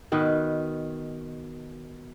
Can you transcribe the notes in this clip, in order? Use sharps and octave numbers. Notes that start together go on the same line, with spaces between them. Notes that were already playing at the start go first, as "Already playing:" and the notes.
B2 D#3 B4